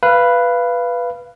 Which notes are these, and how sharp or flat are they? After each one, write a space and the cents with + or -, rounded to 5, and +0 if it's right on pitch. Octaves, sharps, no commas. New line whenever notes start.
B4 +0 F5 -20